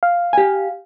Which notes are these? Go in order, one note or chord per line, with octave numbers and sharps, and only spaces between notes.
F5
G4 G#5